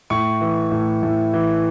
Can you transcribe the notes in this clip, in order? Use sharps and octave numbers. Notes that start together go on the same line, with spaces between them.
A2 C#6
E3
A2
A2
E3